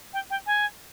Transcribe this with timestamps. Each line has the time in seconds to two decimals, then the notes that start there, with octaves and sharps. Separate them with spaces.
0.14 G5
0.30 G5
0.46 G#5